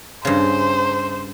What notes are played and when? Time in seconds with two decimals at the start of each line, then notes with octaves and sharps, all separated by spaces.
0.25 G2 C#3 C5